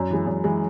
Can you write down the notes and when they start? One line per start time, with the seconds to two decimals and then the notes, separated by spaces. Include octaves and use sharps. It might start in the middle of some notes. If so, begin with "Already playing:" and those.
Already playing: F#2
0.10 E3 G#3
0.27 F#2
0.44 E3 G#3